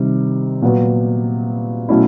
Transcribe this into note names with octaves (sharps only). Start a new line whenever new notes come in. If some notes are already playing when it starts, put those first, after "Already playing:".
Already playing: C3 D#3 G3
A#2 F#3 B3
B2 F#3 A3 C#4 E4